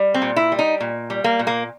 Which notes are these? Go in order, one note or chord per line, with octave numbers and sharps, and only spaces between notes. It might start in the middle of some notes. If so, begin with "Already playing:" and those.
Already playing: G3
C4
A#2
E4
G3
D#4
A#2
G3
A#3
A#2
A#3